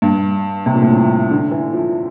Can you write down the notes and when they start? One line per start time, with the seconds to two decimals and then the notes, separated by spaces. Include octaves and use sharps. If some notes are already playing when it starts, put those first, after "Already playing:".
0.02 G2
0.66 C3
0.74 A#2
0.82 A2
0.89 A#2
1.31 D3
1.51 E3
1.73 F3